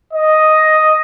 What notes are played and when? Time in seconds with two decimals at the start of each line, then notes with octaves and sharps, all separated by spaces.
0.13 D#5